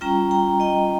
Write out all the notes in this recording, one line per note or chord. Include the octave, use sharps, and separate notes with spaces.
G3 C#4 F4 G5 A#5
G5 A#5
D#5 G5